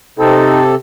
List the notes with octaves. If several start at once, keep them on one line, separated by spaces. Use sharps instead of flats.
C3 C4 D#4 A4